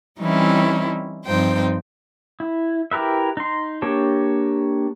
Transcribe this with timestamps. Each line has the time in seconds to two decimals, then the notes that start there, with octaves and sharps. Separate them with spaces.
0.19 E3 G3 C4 C#4 D#4 E4
1.25 G2 F3 C4 D#4 C5 G5
2.40 E4
2.91 E4 G4 A#4 B4 E5
3.37 D#4 C6
3.82 A#3 D4 G4 C#5 A5